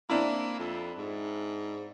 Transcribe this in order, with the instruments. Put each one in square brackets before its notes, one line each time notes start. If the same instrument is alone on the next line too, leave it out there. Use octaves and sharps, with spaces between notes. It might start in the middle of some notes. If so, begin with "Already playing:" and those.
[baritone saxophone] A#3 [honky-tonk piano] C4 D4 E4
[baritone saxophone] F2
G#2